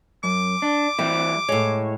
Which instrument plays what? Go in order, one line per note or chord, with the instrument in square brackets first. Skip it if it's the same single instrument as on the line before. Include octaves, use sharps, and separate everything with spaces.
[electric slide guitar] F#2 [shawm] D6
[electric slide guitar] D4
[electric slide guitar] E3 G3 E4 [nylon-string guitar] C4
[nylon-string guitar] A2 G#3 [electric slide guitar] C#5